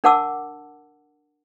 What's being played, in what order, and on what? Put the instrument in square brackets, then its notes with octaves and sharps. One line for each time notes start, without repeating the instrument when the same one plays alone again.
[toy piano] D4 A#4 F#5 A5 D6 E6